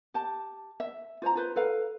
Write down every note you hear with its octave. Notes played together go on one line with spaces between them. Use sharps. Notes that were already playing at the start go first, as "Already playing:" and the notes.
G4 A5
E5
F4 C5 A5 A#5
F4 B4 C5
A4 B4 F5